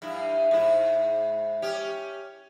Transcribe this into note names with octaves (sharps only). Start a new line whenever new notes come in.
G2 E4
G#2 E4
C#4 G4